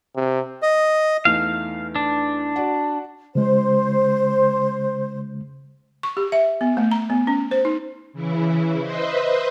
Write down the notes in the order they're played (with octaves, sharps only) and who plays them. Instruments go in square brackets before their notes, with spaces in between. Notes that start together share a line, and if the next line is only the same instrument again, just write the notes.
[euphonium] C3
[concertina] D#5
[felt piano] E2 A3 D#4 [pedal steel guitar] F5
[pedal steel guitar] D4
[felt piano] F#4 D5 F#5
[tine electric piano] C#3 G#3 [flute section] C5
[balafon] C#6
G4
E5
B3
A3
A#5
B3
C#4
C5
D#4
[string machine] C#3 E3 E4
B4 C5 D#5 E5 C6